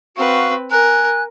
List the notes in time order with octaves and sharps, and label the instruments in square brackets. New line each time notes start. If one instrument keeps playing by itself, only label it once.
[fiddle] C4 B4 [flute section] F#4 F5 C#6
[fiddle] A#4 [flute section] G#5 F#6